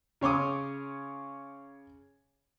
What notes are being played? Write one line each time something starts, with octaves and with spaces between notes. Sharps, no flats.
C#3 C#5 C6 D6 D#6